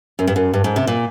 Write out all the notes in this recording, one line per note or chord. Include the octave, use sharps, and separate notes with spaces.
F#2
G2
F#2
G2
G#2
C3
A#2